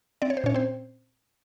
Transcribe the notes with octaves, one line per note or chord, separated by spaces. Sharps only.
C4 D5
C#5
C5
A#2 C#4 C#5
C4 C5